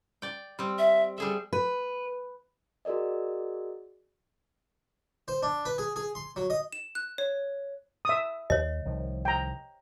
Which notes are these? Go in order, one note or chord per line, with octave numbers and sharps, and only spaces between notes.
D5 G5
G3 C4
E5
G3 G#4 A4 E5
B4
F#4 G#4 A#4 D5 D#5
C5
D4
B4
G#4
G#4
C6
F#3
D#5
E7
F#6
C#5
E5 D#6
D#2 C#5 D#5
C2 D#3 F3
G5 A#5